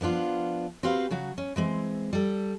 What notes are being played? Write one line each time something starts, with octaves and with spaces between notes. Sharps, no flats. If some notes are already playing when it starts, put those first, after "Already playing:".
F3 B3 D4 F4
C4 F#4 G4 B4 C5 F5
C#3 F#3 F#4
C#4
E3 G#3 C4
G3 A4